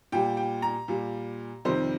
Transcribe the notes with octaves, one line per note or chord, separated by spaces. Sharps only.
A#2 G3 G5
G5
A#5
A#2 G3
F2 C3 D#3 G3 C5